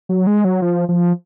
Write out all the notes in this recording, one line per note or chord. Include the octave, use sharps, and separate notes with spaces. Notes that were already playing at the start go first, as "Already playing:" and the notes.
F#3
G#3
F#3
F3
F3